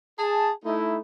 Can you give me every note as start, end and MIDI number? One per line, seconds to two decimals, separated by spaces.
0.19 0.52 68
0.19 0.52 81
0.64 0.98 57
0.64 0.98 63
0.64 0.98 64